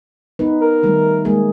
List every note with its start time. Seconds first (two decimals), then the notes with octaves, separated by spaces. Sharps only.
0.39 B3 D#4 B4
0.61 A#4
0.83 D#3 G3 A3
1.25 G#3 A#3 G#4